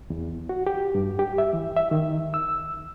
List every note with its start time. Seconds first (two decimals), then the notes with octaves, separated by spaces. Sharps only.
0.10 E2
0.49 F#4
0.67 G4
0.95 G2
1.19 G4
1.38 E5
1.53 E3
1.76 E5
1.91 D#3
2.34 E6